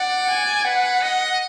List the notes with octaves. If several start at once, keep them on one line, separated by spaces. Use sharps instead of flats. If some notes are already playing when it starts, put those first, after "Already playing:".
Already playing: D5 F#5
G#5
B4 F#5
D#5